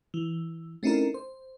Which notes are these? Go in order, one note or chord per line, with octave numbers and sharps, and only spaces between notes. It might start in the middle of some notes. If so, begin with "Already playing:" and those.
E3
A3 C4 C#4 D#4 E4 A#4
C5